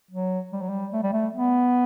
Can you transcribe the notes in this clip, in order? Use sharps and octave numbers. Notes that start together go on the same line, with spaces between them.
F#3
G3
F#3
G3
A3
G3
A3
B3